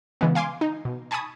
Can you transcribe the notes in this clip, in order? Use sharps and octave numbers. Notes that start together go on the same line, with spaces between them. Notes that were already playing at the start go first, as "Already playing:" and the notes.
C#3 E3 G#3 B3
F5 G#5 C6 D6
D#4
B2
G#5 A5 B5 C#6 D#6 G#6